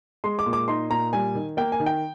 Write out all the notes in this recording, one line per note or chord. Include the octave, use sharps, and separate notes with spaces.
G#3 C6
D6
A#2
D6
D#4 C6
A#2 A#5
G3 G#5
D#3
A#3 G5
G#5
D#3
G5